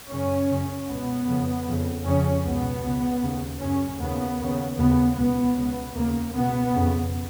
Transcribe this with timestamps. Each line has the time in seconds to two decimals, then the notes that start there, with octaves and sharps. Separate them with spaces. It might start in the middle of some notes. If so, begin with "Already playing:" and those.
0.10 F#2 C#3 C#4
0.49 F#2 C#3
0.88 C#2 B2 B3
1.28 F2 C#3
1.67 F2 C#3
2.05 F2 C#3 C#4
2.44 C#2 B2 B3
2.84 C#2 C#3
3.22 D#2 C#3
3.61 F#2 C#3 C#4
4.00 D#2 C#3 B3
4.40 D#2 C#3
4.78 D#2 C#3 B3
5.17 C#2 B2 B3
5.55 C#2 C#3
5.94 D#2 C#3 A#3
6.34 C#2 B2 B3
6.73 F2 C#3